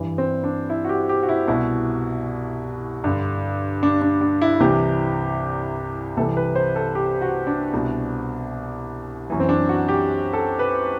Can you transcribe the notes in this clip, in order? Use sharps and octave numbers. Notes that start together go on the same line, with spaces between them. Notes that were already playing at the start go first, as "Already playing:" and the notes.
Already playing: G2 E3
C4
D4
E4
F#4
G4
G4
F#4
E4
C2 B2 E4
G2 D3
D4
D4
D4
E4
C2 C3 E3 G4
C2 C3 E3 A4
B4
C5
A4
G4
F#4
D4
C2 B2
F#2 E3
C4
D4
F#4
G4
A4
B4